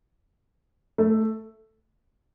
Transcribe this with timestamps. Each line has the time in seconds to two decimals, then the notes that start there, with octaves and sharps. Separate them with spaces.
0.98 A3